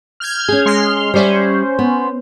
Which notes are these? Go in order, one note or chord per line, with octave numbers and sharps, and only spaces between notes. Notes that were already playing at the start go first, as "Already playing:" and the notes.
F6 G6 G#6
C#4 G#4
G#3 C6 F6
G3 C#4 C5 D5 E5
B3